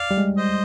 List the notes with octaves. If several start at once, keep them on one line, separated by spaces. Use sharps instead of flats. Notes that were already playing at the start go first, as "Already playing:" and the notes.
Already playing: D5 F5
G3
G#3
C5 D#5